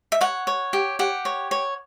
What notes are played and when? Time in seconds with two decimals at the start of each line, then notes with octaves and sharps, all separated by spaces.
0.12 E5
0.21 C#5 F#5
0.47 C#5
0.73 G4
0.99 G4 F#5
1.25 C#5
1.51 C#5